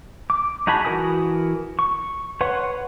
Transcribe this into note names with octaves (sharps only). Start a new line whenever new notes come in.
D6
D#4 F#4 G#4 A5 B5
E3 F#4 A#4 G#5 D#6
C#6
B4 C#5 F#5 C6 C#6